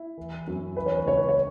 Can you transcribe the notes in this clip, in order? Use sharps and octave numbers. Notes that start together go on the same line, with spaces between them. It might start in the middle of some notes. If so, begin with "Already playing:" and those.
Already playing: E4
E3
F#2
E3 B4
C#5
B4
C#2 C#5
B4
C#5